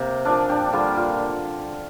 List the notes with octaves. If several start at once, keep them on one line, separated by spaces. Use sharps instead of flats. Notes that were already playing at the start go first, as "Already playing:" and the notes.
Already playing: C3 A#3 G4
A#2 F3 D4 A#4 D5
D4 G4
D3 G3 A#3 D4 F4
F4 A#4